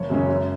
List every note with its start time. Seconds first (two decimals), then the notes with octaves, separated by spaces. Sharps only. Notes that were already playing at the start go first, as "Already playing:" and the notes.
Already playing: F#1 C#5
0.10 F#2 C#3 G#3 C#4
0.28 F#2